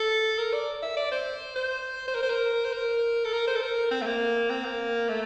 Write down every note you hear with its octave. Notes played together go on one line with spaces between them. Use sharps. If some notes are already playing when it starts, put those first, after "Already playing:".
Already playing: A4
A#4
D5
E5
D5
C5
C5
C5
A#4
C5
A#4
C5
A#4
A4
A#4
C5
A4
A#4
C4
A3
A#3
C4
A#3
A3